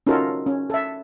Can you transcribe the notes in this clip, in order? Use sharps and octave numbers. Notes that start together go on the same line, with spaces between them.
C#4 D#4 F4 F#4 A4 A#4
C#4
A4 E5